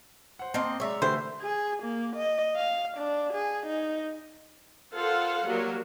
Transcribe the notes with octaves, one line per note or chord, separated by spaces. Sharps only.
C5 F#5
A#3 C4 D#5 A5 C6
G#3 C#5 D5 E5 A#5
D3 E3 A3 G4 C5
G#4
A#3
D#5
F5
D4
G#4
D#4
F4 A4 A#4 C5 F5 F#5
F#3 G3 A#3 F#4 A#4